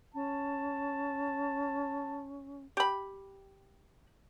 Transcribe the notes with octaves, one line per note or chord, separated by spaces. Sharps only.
C#4 A5
G4 B5